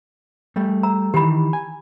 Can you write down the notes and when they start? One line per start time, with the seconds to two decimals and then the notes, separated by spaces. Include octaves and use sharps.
0.56 G3 A3
0.83 A#5 E6
1.14 D#3 E3 G4 B5
1.53 G#5